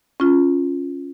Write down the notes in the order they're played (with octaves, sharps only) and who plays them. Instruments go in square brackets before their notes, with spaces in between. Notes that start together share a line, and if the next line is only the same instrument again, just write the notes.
[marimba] C#4 F4